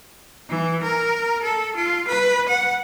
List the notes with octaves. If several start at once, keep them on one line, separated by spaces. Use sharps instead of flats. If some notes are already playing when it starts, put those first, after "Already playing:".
E3
A#4
A4
F4
B4
F#5